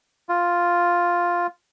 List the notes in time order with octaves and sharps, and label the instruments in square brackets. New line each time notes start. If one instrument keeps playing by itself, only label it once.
[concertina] F4